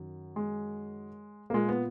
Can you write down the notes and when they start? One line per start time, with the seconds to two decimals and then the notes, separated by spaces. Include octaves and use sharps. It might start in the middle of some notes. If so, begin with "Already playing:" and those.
Already playing: F#2 D#3
0.36 G#3
1.50 A#3
1.54 A#2 G#3
1.69 B3